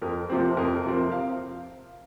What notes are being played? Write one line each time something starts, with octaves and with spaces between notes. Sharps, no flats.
F2 A#4
C3 F3 C4 C5
F2 A#4
C3 F3 C4
F5